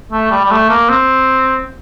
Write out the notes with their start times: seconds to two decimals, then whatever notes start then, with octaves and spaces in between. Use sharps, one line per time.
0.12 A3
0.31 G3
0.44 G3
0.51 A3
0.70 A#3
0.89 C4